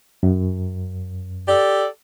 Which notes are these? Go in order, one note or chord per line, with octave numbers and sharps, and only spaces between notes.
F#2
G4 A4 D5